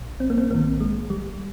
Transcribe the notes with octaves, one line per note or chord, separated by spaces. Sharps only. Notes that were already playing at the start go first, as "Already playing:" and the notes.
Already playing: A#1 A#2
C4
A#3
C4
A#1 G#2 D#3 A#3
G#3
G3